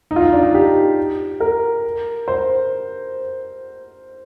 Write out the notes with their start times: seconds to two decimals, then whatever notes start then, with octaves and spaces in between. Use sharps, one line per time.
0.11 D#4
0.16 F4
0.21 D#4
0.32 D4
0.43 D#4
0.54 G4
1.40 A#4
2.28 C5